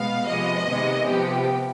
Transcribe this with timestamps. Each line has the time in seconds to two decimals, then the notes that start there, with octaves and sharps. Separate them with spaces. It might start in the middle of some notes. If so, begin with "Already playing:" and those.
Already playing: B2 G#3 B3 F5
0.27 C3 F3 G#3 B3 D#5
0.67 C3 D#3 G#3 B3
1.07 C3 F3 B3 G4